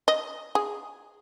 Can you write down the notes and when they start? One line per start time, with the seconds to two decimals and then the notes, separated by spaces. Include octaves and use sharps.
0.08 D#5
0.55 G#4